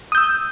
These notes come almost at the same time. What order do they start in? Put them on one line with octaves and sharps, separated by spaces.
D#6 G6 E6